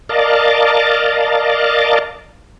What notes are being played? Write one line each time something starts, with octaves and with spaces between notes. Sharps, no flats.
A#4 D5 D#5 F5 A5